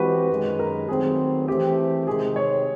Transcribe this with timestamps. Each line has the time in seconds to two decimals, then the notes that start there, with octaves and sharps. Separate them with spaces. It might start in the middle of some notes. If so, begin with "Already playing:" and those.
Already playing: E3 G#3 C4 F#4 G4 B4
0.30 F#2 D#3 G#3
0.59 A#4
0.88 D#3 F#3 A3 C4 G#4
1.48 E3 A3 C4 G4
2.07 C3 D#3 G#3 C4 G#4
2.36 C#5